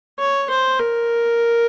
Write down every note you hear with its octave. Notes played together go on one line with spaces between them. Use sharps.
C#5
C5
A#4